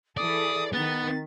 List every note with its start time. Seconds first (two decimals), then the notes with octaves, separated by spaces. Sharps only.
0.17 E3 G#4 A4 D5 D#6
0.73 D#3 B3 A6